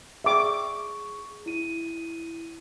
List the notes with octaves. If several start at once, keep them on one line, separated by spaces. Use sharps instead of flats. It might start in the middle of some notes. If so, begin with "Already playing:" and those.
G#4 E5 C#6 D6
E4 D#7